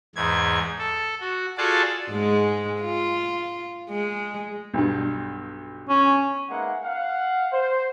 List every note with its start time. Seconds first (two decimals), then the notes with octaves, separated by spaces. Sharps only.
0.16 E2 G#2 G#6
0.78 A4
1.21 F#4
1.58 F4 F#4 G#4 A4 D5 A5
2.10 G#2 G#3
2.81 F4
3.90 G#3
4.74 B1 G2
5.89 C#4
6.50 G#3 A#3 B3 D#4 E5 F#5
6.83 F5 F#5
7.52 C5